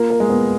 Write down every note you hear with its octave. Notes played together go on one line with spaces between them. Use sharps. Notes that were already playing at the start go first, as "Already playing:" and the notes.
Already playing: A#3 F4 A#4
A#4
G#3
B3